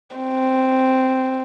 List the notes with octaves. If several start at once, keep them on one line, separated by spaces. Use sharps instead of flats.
C4